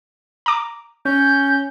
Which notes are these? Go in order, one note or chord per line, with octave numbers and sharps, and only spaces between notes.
A#5 D6
C#4 G6